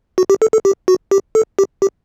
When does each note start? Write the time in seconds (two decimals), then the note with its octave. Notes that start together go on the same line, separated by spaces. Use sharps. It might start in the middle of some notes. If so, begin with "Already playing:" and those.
0.18 F#4
0.30 G4
0.42 A4
0.53 A4
0.65 G4
0.88 F#4
1.11 G4
1.35 A4
1.59 G4
1.82 G4